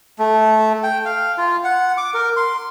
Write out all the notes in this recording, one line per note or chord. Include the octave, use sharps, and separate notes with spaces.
A3
G5
F5
F4
F#5
D6
A#4
C6